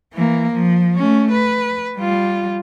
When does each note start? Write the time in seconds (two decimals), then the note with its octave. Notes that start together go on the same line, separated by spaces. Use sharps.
0.13 E3 A#3
0.53 F3
0.96 A3 C#4
1.31 B4
1.97 G3 F4